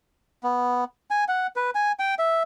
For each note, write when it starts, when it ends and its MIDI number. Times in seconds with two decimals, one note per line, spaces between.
0.44 0.84 59
1.10 1.24 80
1.28 1.47 78
1.56 1.70 71
1.75 1.92 80
1.99 2.15 79
2.19 2.43 76